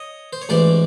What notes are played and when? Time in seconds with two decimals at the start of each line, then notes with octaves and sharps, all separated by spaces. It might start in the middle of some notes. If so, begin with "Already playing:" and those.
Already playing: C#5 D#5
0.33 C5
0.42 C#5
0.49 A1 G#2 E3 C5 D5